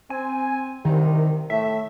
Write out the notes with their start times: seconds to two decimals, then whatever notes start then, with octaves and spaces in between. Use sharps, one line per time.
0.10 C4 G#5
0.85 C2 C3 D#3
1.50 A2 A3 E5